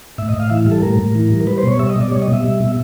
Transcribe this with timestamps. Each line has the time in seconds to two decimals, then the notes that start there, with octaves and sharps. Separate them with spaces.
0.18 A2 E5
0.29 D#5
0.34 A2
0.40 F5
0.50 E3 E5
0.66 G3
0.72 A4
0.82 A2 A#4
0.99 A2
1.15 E3
1.31 G3
1.47 G3 B4
1.58 C5
1.63 B2
1.68 C#5
1.79 G3 E5
1.90 D#5
1.96 B2
2.01 D5
2.11 G3 C#5
2.22 D#5
2.28 B2
2.33 E5
2.44 G3
2.60 B2